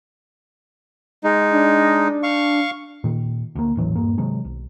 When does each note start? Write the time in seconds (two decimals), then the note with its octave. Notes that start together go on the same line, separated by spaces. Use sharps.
1.24 G#3 D#4
1.51 D4
2.23 F5 C#6
3.04 A#2 D#3
3.55 D2 A#3
3.75 D#1 A1 E3 F#3
3.95 D#1 G2 A#3
4.18 C3 D#3 F#3 G#3
4.44 B1